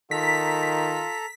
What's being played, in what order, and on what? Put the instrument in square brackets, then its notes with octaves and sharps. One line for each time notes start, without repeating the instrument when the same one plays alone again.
[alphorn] D#3 [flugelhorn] F4 [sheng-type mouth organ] A4 A#5 [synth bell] B6